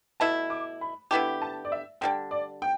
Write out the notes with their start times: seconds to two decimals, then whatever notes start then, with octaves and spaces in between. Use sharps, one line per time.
0.20 B2 A3 E4 A5
0.50 D6
0.81 B5
1.11 D3 B3 E4 G4 A5
1.42 A5
1.65 D5
1.72 E5
2.01 D3 G3 D4 G5
2.31 D5
2.62 G5